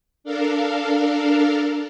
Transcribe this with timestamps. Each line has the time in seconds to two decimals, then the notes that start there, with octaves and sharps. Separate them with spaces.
0.24 D4 A4 A#4 F5